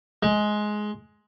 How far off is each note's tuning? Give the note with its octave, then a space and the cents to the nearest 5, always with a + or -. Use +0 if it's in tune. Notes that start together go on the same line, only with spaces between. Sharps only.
G#3 +15